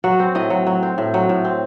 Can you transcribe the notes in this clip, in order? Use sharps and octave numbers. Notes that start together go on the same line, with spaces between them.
F#3 F#4
C4
A2 D#5
F#3
F#3
C4
A2
F#3
A2
C4